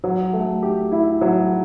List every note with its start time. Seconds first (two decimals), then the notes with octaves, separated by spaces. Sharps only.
0.04 F#3
0.33 A3
0.63 G4
0.92 E4
1.21 F#3